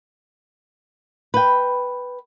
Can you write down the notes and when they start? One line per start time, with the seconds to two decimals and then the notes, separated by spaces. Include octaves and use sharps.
1.34 B4 G5